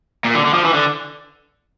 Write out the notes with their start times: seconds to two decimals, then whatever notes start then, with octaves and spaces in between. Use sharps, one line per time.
0.25 A#2
0.34 D3
0.45 D3
0.54 F3
0.64 E3
0.73 D3